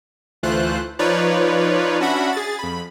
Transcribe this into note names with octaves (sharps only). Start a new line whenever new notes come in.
D2 E3 A3 F4 C5 F#6
F3 D#4 F4 B4 C#5 D5
C#4 D4 F#4 E5 F#5 B5
G#4 A6
F2 B5